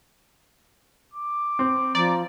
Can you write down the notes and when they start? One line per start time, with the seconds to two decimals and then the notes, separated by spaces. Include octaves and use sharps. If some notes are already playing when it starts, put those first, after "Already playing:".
1.14 D6
1.59 C4
1.95 F3 D5 A#5